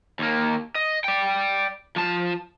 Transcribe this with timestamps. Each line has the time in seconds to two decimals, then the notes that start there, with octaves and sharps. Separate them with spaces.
0.19 D#2 A#3
0.75 D#5
1.04 D5 G5
1.96 F3 A5